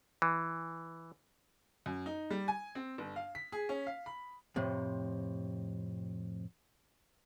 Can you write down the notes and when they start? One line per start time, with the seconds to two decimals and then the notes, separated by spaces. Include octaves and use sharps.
0.22 E3
1.86 F#2
2.06 D#4
2.30 G3
2.48 G#5
2.75 C4
2.98 G1
3.16 F5
3.35 B6
3.52 G#4
3.69 C#4
3.87 F5
4.06 B5
4.56 F2 A2 C3